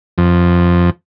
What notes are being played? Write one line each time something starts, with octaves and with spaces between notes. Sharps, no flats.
F2